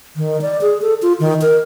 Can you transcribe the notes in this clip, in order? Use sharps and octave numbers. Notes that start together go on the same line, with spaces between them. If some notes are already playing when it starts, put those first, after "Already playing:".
D#3
D5
G#4
A4
F4
D#3
A#4